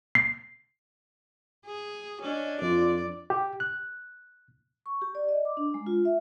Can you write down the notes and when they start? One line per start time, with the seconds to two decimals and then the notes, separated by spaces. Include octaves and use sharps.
0.15 C7
1.66 G#4
2.22 C#4 D4 D#5
2.61 F2 F4 D5
3.30 G4
3.60 F#6
4.86 C#6
5.02 G4
5.15 D5
5.29 D#5
5.45 D6
5.57 D4
5.74 G#3
5.87 F4
6.05 E5